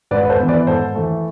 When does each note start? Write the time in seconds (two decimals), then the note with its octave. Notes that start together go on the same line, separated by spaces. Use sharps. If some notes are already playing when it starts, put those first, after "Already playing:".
0.11 G#2 B4 D5
0.25 B4
0.30 A4 C5
0.39 E3 B3
0.48 B4 D5
0.67 G#2 A4 C5
0.95 E3 A3